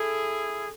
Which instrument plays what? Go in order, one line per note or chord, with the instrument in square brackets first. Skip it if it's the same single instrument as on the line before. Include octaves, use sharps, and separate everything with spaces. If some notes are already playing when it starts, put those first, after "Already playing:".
Already playing: [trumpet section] E4 G#4 [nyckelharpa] A4